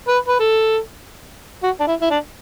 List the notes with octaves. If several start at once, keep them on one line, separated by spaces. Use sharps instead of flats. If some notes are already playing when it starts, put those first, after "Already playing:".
B4
B4
A4
F#4
D4
E4
E4
D4